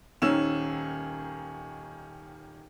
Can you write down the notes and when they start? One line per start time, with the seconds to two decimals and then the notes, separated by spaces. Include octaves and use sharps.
0.22 D#1 D#3 C#4 E6 E7